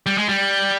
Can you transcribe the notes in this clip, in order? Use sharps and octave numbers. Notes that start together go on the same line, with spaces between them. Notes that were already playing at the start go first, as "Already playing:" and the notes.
G3
G#3
G3